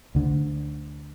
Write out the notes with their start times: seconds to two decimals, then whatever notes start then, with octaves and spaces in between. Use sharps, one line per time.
0.15 D2 D3